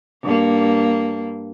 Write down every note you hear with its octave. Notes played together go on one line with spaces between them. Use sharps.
G2 A#3